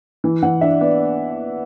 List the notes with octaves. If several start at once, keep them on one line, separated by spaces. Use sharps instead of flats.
E3
E3 F#5
D4 E5
B3 D5